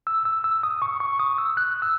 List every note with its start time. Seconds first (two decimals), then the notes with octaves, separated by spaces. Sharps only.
0.07 E6
0.25 E6
0.44 E6
0.63 D#6
0.82 C#6
1.00 C#6
1.19 D#6
1.38 E6
1.57 F#6
1.82 E6